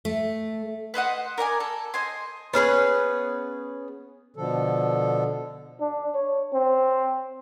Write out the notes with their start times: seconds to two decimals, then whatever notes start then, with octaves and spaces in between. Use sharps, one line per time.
0.05 A3
0.94 B4 C5 D#5 F#5
1.38 A#4 D5 F#5 G#5
1.60 A4
1.94 C5 D#5 G#5 C6
2.54 B3 C#4 G#4 B4
4.36 B2 D3 F3 A4
5.80 D4
6.14 C#5
6.54 C4